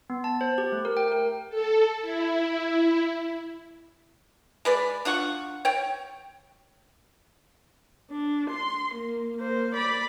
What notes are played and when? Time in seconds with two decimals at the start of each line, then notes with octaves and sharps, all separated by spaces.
0.10 B3
0.24 A5
0.41 C5
0.58 G4
0.72 A3
0.85 A#4
0.97 G5
1.12 A#4
1.50 A4
2.02 E4
4.65 G#3 B4 D5
5.05 D4 F4 F#5 C#6
5.65 C#5 G5
8.11 D4
8.49 C6
8.94 A#3
9.36 A#3 C5
9.75 D5 B5